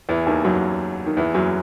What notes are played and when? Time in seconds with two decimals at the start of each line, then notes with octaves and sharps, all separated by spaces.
0.09 E2 E3
0.26 D#2 D#3
0.44 F#2 F#3
1.06 D#3
1.17 E2 E3
1.34 F#2 F#3